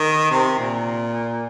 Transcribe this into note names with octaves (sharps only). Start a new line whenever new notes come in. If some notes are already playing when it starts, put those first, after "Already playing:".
Already playing: D#3
C3
A#2